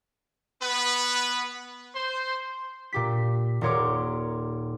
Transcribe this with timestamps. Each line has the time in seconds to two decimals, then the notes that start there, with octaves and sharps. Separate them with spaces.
0.61 B3 B4
1.95 C5 C6
2.93 A#2 G4 B6
3.61 D#1 A#2 A#4 C#5 C6 D6